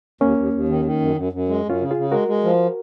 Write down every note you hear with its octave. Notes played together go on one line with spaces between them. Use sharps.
D#2 A#3 C#4
D#2
D#2
D#3
D#3
F#2
F#2
F#2
G#3
F#2 C#4 F4
C#3
F4 G#4
C#3
G#3 F#4 A#4
G#3
F3